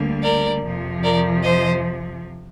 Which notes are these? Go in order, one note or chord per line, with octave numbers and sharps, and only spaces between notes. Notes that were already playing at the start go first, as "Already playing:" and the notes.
Already playing: D2 D3 G3 A#3
A#4 D5
F2 C3 F3
A#4 D5
C5 D#5